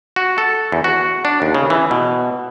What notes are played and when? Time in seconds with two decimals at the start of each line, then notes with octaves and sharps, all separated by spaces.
0.16 F#4
0.38 A4
0.72 E2
0.84 F#4
1.25 D4
1.42 D#2
1.54 C#3
1.70 E3
1.91 B2